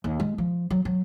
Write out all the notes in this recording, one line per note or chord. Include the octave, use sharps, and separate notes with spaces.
D#2
G#3
F3
F#3
F#3